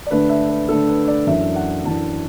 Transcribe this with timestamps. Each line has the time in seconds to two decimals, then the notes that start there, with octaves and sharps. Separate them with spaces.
0.06 D5
0.11 D3 A3 D4 B4
0.29 E5
0.49 B4
0.68 D3 A3 D4 A4
0.88 B4
1.08 D5
1.27 F#2 E3 D4 E5
1.55 F#5
1.84 F#2 E3 D4 A5